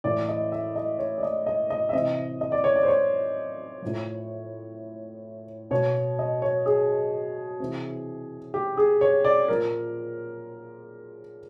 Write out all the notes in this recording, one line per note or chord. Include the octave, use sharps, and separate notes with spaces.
A2 E3 D5
D#5
E5
D#5
C#5
D5
D#5
D#5
D#5
E5
C3 E3 D#5
D#5
D5
C#5
D5
C5
C#5
A2 F3
B2 C#5
D#5
C#5
G#4
C3 E3
G4
G#4
C#5
D5
A#2 F3 A#4